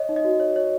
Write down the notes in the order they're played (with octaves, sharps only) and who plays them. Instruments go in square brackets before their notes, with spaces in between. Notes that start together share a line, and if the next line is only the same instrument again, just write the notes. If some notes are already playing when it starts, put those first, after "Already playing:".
Already playing: [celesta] C#5 D#5
D#4
D#5
F#4
C#5
C#5